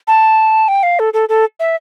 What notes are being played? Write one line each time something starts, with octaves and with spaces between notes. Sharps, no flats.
A5
G5
F5
A4
A4
A4
E5